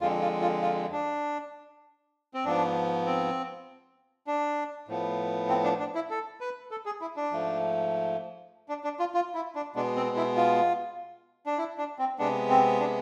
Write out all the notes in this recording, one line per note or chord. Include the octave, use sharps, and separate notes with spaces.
F2 D3 G#3 F4
F4
F4
F4
D4
C4
G#2 F3 B3 D4
C4
D4
A2 F3 B3
C4
D4
D4
E4
A4
B4
A4
G#4
E4
D4
G#2 F3 A3
D4
D4
F4
F4
E4
D4
B2 G#3 B3 D4
C4
E4
F4
D4
E4
D4
C4
C3 G#3 B3 D4
C4
D4